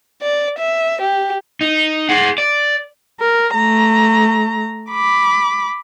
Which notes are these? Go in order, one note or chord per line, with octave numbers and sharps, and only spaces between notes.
D5
E5
G4
D#4
G#4 F#5
D5
A#4
A3 A#5
B5 D6